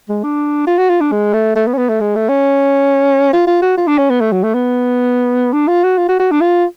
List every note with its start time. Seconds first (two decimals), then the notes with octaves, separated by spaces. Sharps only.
0.09 G#3
0.24 D4
0.67 F4
0.78 F#4
0.90 F4
1.01 D4
1.12 G#3
1.34 A3
1.56 A3
1.68 B3
1.74 C#4
1.78 B3
1.89 A3
2.01 G#3
2.15 A3
2.29 C#4
3.33 F4
3.47 F4
3.62 F#4
3.78 F4
3.88 D4
3.98 C#4
4.10 B3
4.21 A3
4.33 F#3
4.43 A3
4.55 B3
5.53 D4
5.68 F4
5.84 F#4
5.98 F4
6.09 F#4
6.20 F#4
6.32 D4
6.42 F4